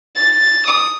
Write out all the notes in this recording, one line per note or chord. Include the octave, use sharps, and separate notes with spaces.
A6
D#6